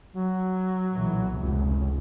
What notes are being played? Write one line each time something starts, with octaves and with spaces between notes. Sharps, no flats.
F#3
B1 A#2 E3
F1 C#2